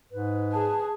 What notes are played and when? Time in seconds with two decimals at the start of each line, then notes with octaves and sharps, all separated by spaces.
0.12 G#2 B4
0.53 G#4 A5